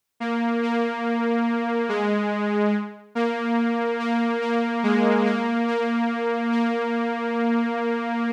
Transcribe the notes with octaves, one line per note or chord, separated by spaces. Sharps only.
A#3
A#3
G#3
A#3
A#3
A#3
G#3
A#3
A#3
A#3